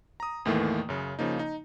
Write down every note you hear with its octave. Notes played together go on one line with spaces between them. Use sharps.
A#5 D#6
E2 A2 D#3 E3 A3 A#3
F#2 C#3
C#3 F3 A#3 D#4
D#4